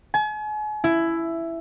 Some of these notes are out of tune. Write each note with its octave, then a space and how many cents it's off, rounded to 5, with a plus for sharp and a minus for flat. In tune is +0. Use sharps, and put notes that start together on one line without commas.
G#5 +40
E4 +10